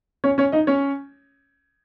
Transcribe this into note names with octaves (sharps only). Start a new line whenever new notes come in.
C#4 C#5
C#4 C#5
D#4 D#5
C#4 C#5